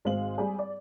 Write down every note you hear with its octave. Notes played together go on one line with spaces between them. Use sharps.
G#1 G#3 C5 F5 F#7
G3 G#4
D5